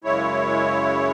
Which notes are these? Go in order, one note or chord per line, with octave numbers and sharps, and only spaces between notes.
F#2 C#3 G#3 E4 C#5